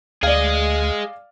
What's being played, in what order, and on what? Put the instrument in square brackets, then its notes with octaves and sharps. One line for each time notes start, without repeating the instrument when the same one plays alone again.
[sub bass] D2 [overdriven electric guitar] G#4 D#5 [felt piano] D5 F5